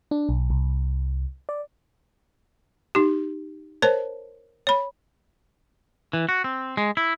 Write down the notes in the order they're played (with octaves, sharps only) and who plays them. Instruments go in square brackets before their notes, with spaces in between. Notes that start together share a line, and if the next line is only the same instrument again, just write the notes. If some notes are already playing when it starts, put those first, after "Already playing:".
[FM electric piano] D4
B1
C2
D5
[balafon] D#4 G4
A#4 C5 C#5 A5
C#5 B5
[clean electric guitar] E3
F#4
C4
G#3
E4